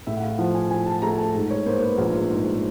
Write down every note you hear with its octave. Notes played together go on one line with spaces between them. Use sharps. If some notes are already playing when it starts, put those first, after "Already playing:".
A2 E5
F#5
F5
F3 F#5
G#5
F3 G#5
A5
A3 A#5
A5
G#2
C#5
A#3 C5
B4
A#1 A#4
G#2